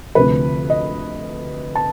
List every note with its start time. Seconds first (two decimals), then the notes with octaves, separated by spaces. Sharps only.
0.15 D2 C3 F3 B4
0.70 D#5
1.75 A5